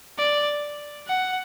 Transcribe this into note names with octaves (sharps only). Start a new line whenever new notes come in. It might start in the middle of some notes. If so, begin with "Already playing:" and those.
D5
F#5